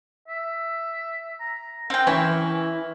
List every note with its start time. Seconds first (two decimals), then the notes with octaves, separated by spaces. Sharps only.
0.28 E5
1.40 A#5
1.90 C4 A#4 G5
2.07 E3 C#4 E4